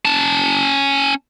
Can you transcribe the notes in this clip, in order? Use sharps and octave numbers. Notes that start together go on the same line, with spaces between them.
C#4 A5